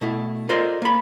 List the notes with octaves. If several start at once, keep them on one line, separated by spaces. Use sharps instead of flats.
B2 A3 E4
F4 A4 A#4 C5 D5 D#5
A#3 B5